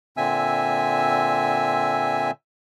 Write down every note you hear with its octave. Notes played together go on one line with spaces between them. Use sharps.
A#2 D3 C4 E5 G#5 E6